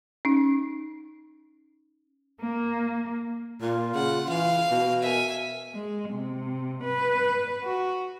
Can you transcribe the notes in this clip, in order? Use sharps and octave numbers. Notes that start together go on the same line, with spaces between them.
C#4 D#4
A#3
A#2 F4
C#3 F#5
E3 F5
B2
A#4 E5 G#5
G#3
C3
B4
F#4